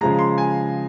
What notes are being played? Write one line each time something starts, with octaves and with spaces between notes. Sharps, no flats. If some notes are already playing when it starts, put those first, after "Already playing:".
C#3 F3 G#3 A#5
C6
G#5